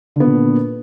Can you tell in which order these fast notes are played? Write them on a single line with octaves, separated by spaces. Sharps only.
D3 B3 A#2